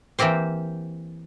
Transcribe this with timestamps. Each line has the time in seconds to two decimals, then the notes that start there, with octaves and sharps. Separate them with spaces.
0.19 E3 A#3 C4 G4 C5